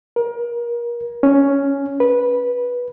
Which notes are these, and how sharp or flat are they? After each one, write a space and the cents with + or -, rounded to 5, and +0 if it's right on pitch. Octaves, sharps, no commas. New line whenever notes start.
A#4 +30
C#4 +5
B4 -15